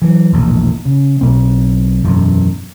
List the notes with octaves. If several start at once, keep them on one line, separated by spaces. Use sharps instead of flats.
E3 F#3
E1 A#1 A2
C#3
B1 C4
E1 F#2 D#3